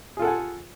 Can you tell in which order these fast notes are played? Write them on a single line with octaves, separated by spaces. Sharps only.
G#4 F4 A4 F#5 G#5